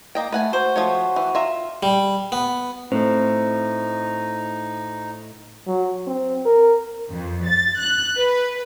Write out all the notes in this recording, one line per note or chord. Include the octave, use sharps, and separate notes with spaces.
A#3 D#5 G5
A3 B4 F#5 G#5
F#4 C5
F3 A3 C#5
E3
F4 E5 A#5
G3
B3
A2 A3 C4 D#4 C5
F#3
C4
A#4
F2
A6
F#6
B4